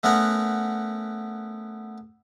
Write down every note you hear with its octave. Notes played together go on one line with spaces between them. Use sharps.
A3 B3 C#4 A#4 F#5